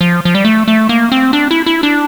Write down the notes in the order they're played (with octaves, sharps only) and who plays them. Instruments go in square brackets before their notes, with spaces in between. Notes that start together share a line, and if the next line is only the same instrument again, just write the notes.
[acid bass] F3
F3
G3
A3
A3
A#3
C4
D4
E4
E4
D4